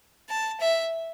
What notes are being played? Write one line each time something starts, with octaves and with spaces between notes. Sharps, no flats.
A5
E5